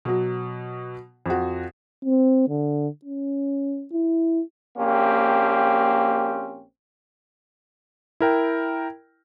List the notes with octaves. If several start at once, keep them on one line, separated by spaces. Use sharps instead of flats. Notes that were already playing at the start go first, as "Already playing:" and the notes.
B2 F#3
F2 F#4
C4
D3
C#4
E4
A#1 A#3 C4 C#4 G4
E4 A#4 G5